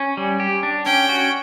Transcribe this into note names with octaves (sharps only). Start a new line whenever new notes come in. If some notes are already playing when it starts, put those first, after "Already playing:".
Already playing: C#4
G3
G4
D4
C#4 G5
F#4